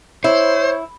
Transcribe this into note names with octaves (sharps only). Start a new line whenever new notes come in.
E4 C5 C#5